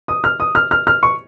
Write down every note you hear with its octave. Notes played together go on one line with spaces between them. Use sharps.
D#6
F6
D#6
F6
F6
F6
C#6